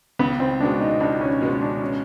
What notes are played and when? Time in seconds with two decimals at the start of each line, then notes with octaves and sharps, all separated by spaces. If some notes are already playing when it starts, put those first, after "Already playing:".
0.19 C#2 B3
0.40 C4
0.60 B2 G#3 B3 D4
0.80 D#4
1.00 C#2 D4
1.21 C#4
1.41 B2 G#3 B3 C#4
1.61 D4
1.81 C#4